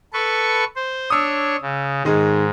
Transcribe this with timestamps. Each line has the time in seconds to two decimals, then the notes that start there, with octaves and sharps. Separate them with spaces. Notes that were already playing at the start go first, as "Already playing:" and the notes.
0.13 A4 B4 C#6
0.76 C5
1.10 D4 C#5 D#6 E6
1.61 C#3
2.05 G#2 D#3 G#3 G#4